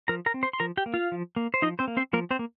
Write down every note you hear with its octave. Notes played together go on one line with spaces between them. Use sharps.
F3 A#4 A#5
A#4 A#5
C4
C5 C6
C6
F3 A#4 A#5
G4 G5
A#3
F4 F5
F3
A#3
C5
F3 D#4 D#5
C4 C5
A#3
C4 C5
F3 A#3 A#4
C4 C5
A#3